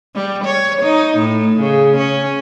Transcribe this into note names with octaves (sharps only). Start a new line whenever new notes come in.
G3
C#5
D#4
A2
C#3
C#4